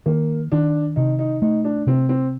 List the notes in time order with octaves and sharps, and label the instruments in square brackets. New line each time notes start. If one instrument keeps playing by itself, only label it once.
[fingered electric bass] D#3 [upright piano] A#3
[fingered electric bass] D#3 [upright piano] D4
[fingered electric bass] C3 [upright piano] D#4
[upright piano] D#4
[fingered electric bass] A3 [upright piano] D#4
[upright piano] D4
[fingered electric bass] C3 [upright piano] C4
[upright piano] C4